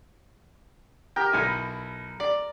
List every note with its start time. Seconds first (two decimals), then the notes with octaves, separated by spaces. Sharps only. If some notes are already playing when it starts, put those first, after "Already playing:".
1.16 G4 A#4 G5
1.32 B1 E4 G#5
2.20 D5